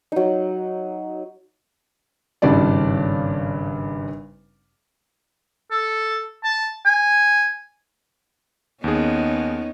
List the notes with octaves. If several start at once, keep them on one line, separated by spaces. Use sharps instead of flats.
F#3 D#4
G#1 G2 C#3 C#4 D4 D5
A4
A5
G#5
D#2 B3 C#4 D#4 G#4